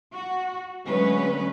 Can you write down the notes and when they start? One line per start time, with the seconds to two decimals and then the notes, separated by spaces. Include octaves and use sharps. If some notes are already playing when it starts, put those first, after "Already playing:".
0.13 F#4
0.85 D2 F#3 G#3 C#4 B4